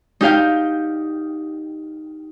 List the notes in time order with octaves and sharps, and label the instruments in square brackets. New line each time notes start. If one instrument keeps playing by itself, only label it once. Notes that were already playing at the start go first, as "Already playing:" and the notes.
[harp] D#4 G4 F5 G5